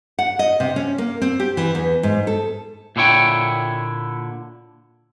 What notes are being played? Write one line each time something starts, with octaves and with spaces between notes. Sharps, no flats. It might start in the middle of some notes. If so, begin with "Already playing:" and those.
F#5
D#5
C3
C#4
A#3
C4
G4
E3
E2
G#2
A4
A#2 D3 E4 C#5 G5